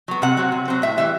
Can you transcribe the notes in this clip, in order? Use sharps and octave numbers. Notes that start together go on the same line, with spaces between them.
F#3 B3
C3 F#5
F#3 C4
C3
F#3 C4
A2 E5
E3 G3 E5